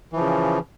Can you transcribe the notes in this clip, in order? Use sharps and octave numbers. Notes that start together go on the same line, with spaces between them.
C#3 E3 F3